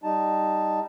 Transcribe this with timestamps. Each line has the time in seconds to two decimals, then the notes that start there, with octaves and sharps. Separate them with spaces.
0.03 G3 D#4 A5